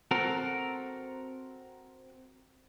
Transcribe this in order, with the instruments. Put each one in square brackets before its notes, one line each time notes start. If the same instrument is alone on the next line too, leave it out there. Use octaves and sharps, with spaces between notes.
[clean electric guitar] C4 F#4 A4 A#4